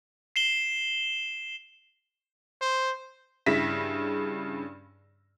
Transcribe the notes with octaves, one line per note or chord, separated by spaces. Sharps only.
C7 E7 G7
C5
G2 C#3 E4 A#6 B6